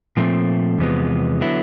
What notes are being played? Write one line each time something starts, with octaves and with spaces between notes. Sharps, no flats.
A#2 F3 A3 C4
E2 C3 F3 G#3 B3
D3 F#3 B3 E4